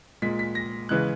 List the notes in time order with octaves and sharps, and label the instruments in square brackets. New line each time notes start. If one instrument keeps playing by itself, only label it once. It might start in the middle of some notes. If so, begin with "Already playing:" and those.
[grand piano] A#2 G#3 B6
B6
A#6
C#3 E3 G#3 F#6